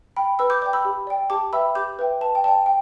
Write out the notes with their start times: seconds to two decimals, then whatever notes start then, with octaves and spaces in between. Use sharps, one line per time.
0.16 G5 B5
0.39 B4 B5 E6
0.50 D6 G6
0.62 D5 G5 D6 G6
0.73 B5 E6
0.85 G4
1.07 D5 G5
1.30 G4 A5 D6
1.53 B4 E5 G5 B5 E6
1.75 G4 D6 G6
1.99 B4 E5 G5
2.21 B4 A5
2.35 G5
2.44 D5 A5
2.48 G5
2.66 G5